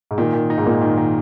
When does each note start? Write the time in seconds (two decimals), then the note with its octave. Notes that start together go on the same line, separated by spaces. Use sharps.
0.11 G#2
0.18 A#2 D#3
0.33 D#3
0.50 D#4
0.58 G#2
0.65 A#2 A#3
0.81 D#3
0.97 D#3